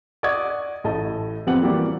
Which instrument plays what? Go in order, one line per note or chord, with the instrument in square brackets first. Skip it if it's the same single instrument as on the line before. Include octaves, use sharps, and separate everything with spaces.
[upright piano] D5 D#5 F#5 C#6 D#6 G#6
A1 A2 D#5 A5
F2 B3 C4 G4 F#5 F#7
E3 G3 A#3 F#4 G4 D5